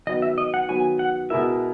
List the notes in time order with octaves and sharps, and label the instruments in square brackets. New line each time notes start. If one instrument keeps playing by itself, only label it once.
[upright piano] D#3 F#3 B3 F#4 [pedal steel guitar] D#5
[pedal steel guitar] E5
D#5
F#5
[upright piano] D#3 F#3 B3 F#4 [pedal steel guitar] G#5
[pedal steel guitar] F#5
[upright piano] B2 G#3 B3 E4 A#4 [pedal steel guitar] E5